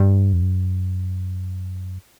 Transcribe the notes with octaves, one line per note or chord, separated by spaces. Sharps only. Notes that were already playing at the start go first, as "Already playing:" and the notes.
Already playing: G2
F2
F#2